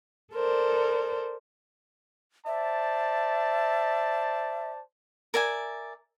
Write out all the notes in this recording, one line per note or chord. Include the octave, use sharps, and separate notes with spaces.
A4 A#4 C5 D5
C5 D5 E5 A5
A#4 D5 E5 G#5